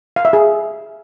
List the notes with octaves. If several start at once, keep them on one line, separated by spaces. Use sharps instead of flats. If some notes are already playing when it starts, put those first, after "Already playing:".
F5
E5
G#4